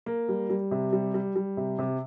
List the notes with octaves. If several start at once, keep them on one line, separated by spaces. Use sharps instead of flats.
A#3
G3
G3
C3
G3
G3
G3
C3
C3